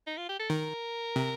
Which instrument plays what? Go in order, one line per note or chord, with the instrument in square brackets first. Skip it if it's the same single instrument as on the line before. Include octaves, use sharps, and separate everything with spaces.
[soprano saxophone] D#4
F4
G4
A4
[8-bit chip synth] D#3 [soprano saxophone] A#4
[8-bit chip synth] C3